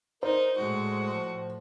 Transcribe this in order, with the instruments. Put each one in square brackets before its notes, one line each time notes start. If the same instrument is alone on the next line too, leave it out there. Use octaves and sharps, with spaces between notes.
[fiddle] D#4 [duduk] A#4 [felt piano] C5 D5
[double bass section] A2 [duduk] G#3 [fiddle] F#4
[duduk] F3